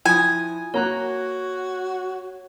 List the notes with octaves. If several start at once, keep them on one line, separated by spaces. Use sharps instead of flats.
F3 E4 G#5 D#6
A#3 F#4 C#5 A#5 F#6